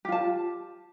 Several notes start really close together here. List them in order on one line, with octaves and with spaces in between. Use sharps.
G4 F4 A5